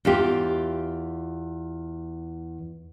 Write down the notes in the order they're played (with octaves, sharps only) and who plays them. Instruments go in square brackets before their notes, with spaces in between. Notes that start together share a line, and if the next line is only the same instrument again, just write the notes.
[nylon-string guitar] E2 F4 G4